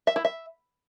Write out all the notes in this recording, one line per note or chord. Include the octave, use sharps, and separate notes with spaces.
E5
E4
E5